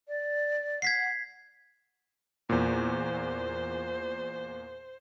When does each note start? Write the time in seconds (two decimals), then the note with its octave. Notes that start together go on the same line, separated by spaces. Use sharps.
0.08 D5
0.82 F#5 G#6 B6 C7
2.49 E2 A#2 C5